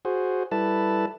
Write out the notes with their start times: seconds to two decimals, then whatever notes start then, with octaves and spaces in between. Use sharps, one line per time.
0.05 F#4 G#4 C5
0.52 G3 E4 A4 B4 A5